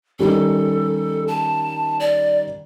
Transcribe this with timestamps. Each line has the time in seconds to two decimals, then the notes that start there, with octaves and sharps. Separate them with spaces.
0.19 D#3 G3 C#4 A4
1.28 A5
2.00 D5